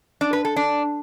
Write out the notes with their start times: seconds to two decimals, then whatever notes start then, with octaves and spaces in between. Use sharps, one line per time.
0.21 D4
0.33 B4
0.45 A4
0.56 D4